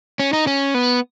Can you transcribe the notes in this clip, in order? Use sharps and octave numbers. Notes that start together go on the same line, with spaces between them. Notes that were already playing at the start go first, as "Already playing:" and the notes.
C#4
D#4
C#4
B3